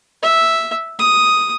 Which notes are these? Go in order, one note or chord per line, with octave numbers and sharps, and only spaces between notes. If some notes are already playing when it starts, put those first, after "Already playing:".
E5
D#6